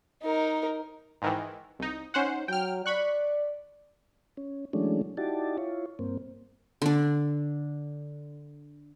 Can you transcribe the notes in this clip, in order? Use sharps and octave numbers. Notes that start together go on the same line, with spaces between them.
D#4 A#4
G#2 D#3 E3
C2 D#4
C#4 D#4 C5 F#5
F#3 G5 F6
D5 B5 C#6 F#6
C#4
E3 F#3 G#3 A3 C#4 D4
D#4 E4 F#4 G4 D5 A5
E4 F4 C#5
G2 A#3 C4
D3 D4